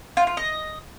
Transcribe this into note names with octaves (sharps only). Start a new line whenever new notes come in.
F4
F4
D#5